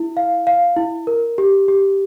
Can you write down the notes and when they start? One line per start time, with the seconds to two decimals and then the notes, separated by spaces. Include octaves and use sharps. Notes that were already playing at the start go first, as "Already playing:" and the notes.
Already playing: E4
0.17 F5
0.47 F5
0.77 E4
1.07 A#4
1.38 G4
1.68 G4